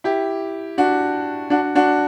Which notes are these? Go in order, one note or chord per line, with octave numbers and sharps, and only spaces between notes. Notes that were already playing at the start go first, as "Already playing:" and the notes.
E4 G4
D4 F#4
D4 F#4
D4 F#4